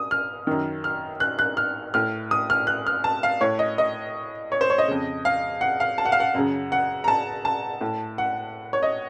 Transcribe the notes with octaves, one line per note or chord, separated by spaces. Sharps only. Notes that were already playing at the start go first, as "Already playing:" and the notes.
Already playing: D#6
F6
F#2 D#3
F6
F#6
F#6
F6
A2 F6
D#6
F6
F#6
F6
A5
F5
A2 C#5
D#5
D#5
C#5
C5
C#5
D#5
F2 C#3
F5
F#5
F5
A5
F#5
F5
F#5
F#2 C#3
F#5
A#5
A5
A5
A2
F#5
C#5
D#5